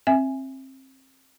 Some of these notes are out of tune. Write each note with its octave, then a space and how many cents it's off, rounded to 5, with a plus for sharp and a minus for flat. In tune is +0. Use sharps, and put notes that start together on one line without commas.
C4 +30 E5 +0 G#5 +0